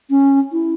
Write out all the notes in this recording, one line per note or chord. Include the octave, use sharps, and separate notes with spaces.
C#4
E4